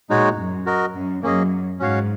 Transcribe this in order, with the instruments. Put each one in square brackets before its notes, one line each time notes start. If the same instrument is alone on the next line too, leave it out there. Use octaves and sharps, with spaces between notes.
[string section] A#2 [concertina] G#3 D#4 F#4 C#5
[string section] F#2
[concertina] F#4 A#4 D#5
[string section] F#2
[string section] F#2 [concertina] A#3 C#4 G#4 D#5
[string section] G#2 [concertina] C#4 F#4 C#5 F5